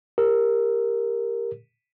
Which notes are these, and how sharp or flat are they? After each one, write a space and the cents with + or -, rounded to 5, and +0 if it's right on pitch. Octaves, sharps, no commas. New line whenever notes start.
G4 +20 A#4 +0